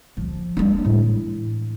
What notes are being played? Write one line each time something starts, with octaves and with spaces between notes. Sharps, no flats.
F3
G#3 D4
A2 E3